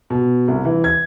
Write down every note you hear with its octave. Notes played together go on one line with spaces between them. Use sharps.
B2
C2
E3
G#6